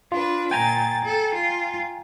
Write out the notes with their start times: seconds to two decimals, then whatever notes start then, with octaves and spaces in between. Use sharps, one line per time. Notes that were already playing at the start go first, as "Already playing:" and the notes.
0.12 D4 F4 B4
0.51 A#2 G5 G#5 A#5 A6
1.04 A4
1.33 F4